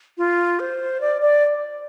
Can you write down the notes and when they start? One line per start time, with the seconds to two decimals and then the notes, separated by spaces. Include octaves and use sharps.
0.18 F4
0.59 C5
1.01 D5
1.22 D5